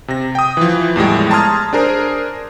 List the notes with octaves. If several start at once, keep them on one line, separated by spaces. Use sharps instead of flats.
C3 A#6
G5 D#6
E3 F3
E2 A2 G3 G#3
A5 A#5 C6 D#6 F6 G#6
D4 G#4 A#4 C5